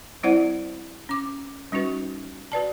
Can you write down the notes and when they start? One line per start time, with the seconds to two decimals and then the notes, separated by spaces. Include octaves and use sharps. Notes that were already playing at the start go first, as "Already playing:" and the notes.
0.23 G3 C4 E4 C5 D5 F#5
1.09 C#4 D6
1.72 G3 C#4 D#4 F#4 B4
2.52 F#4 B4 D5 A5